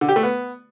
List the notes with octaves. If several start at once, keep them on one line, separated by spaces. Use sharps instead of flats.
D3
G4
A3
B3